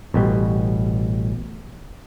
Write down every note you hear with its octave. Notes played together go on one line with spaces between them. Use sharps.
A1 B2 G3